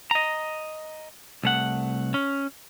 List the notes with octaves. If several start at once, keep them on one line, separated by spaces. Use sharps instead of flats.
D#5 A#5
C2 A3 F#5
C#4